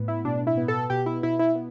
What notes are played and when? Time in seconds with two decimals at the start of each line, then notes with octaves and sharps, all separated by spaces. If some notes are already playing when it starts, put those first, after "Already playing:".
Already playing: A2 B3
0.08 E4
0.25 B2 D4
0.47 E4
0.57 B3
0.68 A4
0.90 B2 G4
1.06 E4
1.23 B2 E4
1.39 E4
1.55 B3